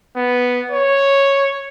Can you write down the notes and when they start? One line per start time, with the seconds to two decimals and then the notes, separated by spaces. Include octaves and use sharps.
0.16 B3
0.71 C#5